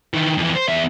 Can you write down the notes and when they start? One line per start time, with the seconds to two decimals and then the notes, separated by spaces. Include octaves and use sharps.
0.14 D#3 E3
0.37 F2 E3
0.56 C5
0.68 E2 E5